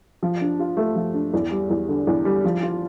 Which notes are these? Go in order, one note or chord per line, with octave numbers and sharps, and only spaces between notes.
F3
D4
F4
A3
F3
D4
E2
G3
E2
D3
E2
G3
F3
F4